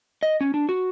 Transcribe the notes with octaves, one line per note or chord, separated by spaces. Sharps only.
D#5
C#4
D4
F#4